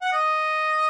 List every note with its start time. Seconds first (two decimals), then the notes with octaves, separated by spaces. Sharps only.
0.02 F#5
0.13 D#5